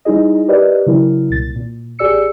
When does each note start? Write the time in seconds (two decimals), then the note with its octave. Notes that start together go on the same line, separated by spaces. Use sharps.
0.05 G3 D#4 E4 G#4 D#5
0.48 G4 A#4 B4 D5 D#5
0.86 C#3 F#3 E4 A#4
1.30 C2 A#2 A6
1.56 A#2
1.99 A1 G4 G#4 D5 E6 C#7